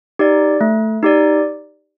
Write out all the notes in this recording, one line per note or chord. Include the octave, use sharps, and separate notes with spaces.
D#4 G4 D5
A3
D#4 G4 D5